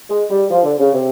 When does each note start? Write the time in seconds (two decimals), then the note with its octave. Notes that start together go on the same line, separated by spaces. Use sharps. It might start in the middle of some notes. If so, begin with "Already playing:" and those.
0.10 G#3
0.31 G3
0.49 F3
0.64 D3
0.79 C#3
0.94 C3